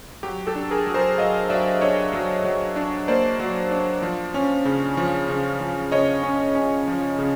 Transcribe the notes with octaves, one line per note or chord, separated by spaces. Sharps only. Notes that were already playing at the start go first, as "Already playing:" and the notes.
F#3 G4
G4 A4
D4
G#4 A#4
F#3
A#4 C5
F#3 D#5 F5
F#3 D5 E5
D4 C#5 D#5
F#3
F#3
D4
A#3 C5 D5
F#3
D4
F3
C#4
C#3
F3
C#3
F3
C#3 C#5 D#5
C#4
C#4
F3
C#3